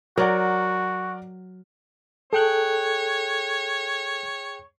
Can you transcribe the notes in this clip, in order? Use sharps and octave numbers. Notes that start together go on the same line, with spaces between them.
F#3 F#4 A#4 D5 F#5
G#4 A4 C#5 G5 F#6